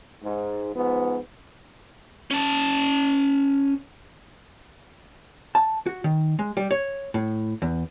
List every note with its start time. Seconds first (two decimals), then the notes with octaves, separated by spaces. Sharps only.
0.23 G#2
0.74 G#2 F3 B3
2.31 C#4 A5
5.55 A5
5.86 F#4
6.04 D#3
6.39 G#3
6.57 G3
6.71 C#5
7.14 A2
7.62 E2